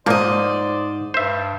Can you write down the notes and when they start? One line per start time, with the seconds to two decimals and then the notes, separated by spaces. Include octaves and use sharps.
0.06 G#2 F3 A#3 C5 D5 D#5
1.14 G2 C5 E5